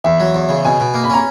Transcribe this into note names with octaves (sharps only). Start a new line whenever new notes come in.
E2 E5
F#3
E2
C#3
B2 G#5
B2
A#3
B5
C#4 A#5